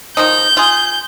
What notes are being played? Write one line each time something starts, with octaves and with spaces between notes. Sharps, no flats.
D#3 F3 D#4 G6
F4 G#4